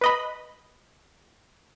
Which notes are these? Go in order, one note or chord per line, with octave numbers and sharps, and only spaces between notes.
B4 D#5 B5